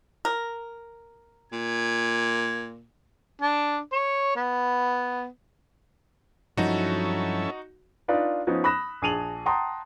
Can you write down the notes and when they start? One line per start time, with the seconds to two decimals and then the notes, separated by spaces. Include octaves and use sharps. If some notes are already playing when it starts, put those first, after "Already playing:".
0.25 A#4
1.52 A#2 G#6
3.42 D4
3.93 C#5
4.36 B3
6.57 G2 F3 F#3 C#4 D#4 E4 F#4 A4
8.08 D4 D#4 F4 B4 D5
8.47 F3 B3 C#4 D#4
8.64 B5 D#6 F#6 A#6 E7
9.02 A#1 G#4 A5 D#7 F7 F#7
9.46 F#5 G5 A5 A#5 C6 D#6